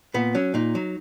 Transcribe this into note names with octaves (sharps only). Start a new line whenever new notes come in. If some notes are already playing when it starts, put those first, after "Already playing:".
A#2 B3
F#3 C#4
A#2 D#4
F#3